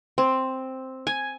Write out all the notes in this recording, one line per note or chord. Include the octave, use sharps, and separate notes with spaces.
C4
G#5